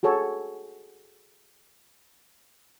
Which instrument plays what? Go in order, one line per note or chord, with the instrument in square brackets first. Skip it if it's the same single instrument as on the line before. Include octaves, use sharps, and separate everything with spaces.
[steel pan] F#4 G#4 A4 C#5